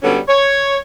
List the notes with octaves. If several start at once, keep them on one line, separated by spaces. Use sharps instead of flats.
D3 F#3 G3 B3 C#4
C#5